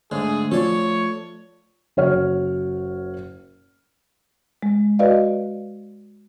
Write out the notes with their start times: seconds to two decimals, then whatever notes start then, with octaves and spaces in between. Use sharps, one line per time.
0.11 G#2 D3 A3 G#4
0.52 F3 A4 C#5 D5
1.97 F#1 F#4 C#5 F#5 F6
4.63 G#3
4.99 F#4 B4 D5 D#5 F5